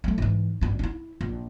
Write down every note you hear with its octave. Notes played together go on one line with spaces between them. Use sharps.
F#3 A3
G#2 E3
A1 G2
D4 E4
A#1